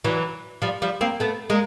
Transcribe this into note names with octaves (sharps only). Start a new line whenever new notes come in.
E3 F#3
F3 G3
F3 G3
A#3 C4
A3 B3
G#3 A#3